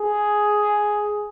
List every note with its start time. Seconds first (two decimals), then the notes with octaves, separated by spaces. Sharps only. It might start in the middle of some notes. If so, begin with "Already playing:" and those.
Already playing: G#4